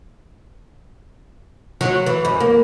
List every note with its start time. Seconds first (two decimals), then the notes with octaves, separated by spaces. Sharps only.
1.81 F#3
2.06 E3
2.25 F#2
2.40 A#3